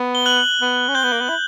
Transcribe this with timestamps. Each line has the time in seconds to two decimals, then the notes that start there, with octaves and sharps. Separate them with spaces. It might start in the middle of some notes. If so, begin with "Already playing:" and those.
Already playing: B3
0.15 G7
0.26 F#6 F#7
0.61 B3
0.88 C#4
0.95 C4 G6 G7
1.03 B3
1.12 A#3
1.21 B3
1.29 E4